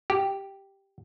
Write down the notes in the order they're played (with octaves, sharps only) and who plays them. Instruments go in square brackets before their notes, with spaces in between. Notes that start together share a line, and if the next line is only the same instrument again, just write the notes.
[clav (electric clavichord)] G4